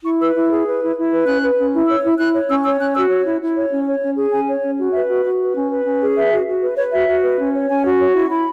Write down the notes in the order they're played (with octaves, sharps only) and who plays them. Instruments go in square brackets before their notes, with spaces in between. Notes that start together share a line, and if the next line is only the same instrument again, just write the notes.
[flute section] E4 C#6
B4 E6
E4
G#4
B4
E4
E4
B4
C#4 F#6
B4
C#4
E4
C#5 E6
E4
E4 F#6
C#5
C#4 E6
C#5 E6
C#4 F#6
F#4 E6
C#5
E4
E4
C#5
C#4
C#5
C#4
G#4
C#4 G#5
C#5
C#4
F#4
B4 E5
F#4
F#4
B4
C#4
B4
C#4
G#4
B4 E5
F#4
F#4
B4
B4 C#5
F#4 E5
F#4
B4
C#4
C#5
C#4 G#5
F#4
C#5
E4
C#6
E4 B5